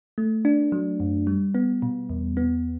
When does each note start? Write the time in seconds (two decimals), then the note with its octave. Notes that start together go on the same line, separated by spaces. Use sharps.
0.18 A3
0.45 D4
0.72 F#3
1.00 F#2
1.27 G3
1.55 B3
1.82 B2
2.09 E2
2.37 B3